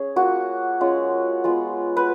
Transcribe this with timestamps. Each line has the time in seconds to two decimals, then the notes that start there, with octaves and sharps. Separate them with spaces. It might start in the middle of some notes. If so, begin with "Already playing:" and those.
Already playing: C#4 G#4
0.16 A#3 F4 F#4
0.81 G#3 C#4 F4
1.44 G#3 B3 F4
1.97 B4